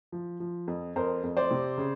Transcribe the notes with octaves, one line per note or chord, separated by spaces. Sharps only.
F3
F3
F2
F2 A#4 C5
F2
C5 D5
C3
C#3